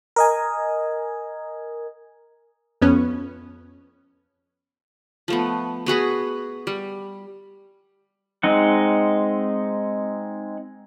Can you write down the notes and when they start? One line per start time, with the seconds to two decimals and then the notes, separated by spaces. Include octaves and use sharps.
0.16 A#4 D#5 G#5
2.82 F2 B3 C#4
5.28 F3 A3 B3
5.86 B3 F#4 G#4 B4
6.67 G3
8.43 G#3 C4 D#4 F#5